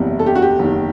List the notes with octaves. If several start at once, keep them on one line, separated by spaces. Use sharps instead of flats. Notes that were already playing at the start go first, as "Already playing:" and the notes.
Already playing: F#1 E2 C3 E3 G3
A4
G4
F#4
G4
F#1 E2 D#3